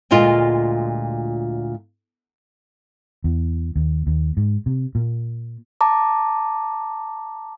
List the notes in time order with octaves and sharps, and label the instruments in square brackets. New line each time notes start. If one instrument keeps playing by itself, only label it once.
[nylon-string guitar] D2 A#2 G#3 F4
[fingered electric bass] E2
D#2
D#2
G#2
C3
A#2
[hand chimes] A5 A#5 D6